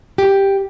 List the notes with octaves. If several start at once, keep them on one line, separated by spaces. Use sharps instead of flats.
G4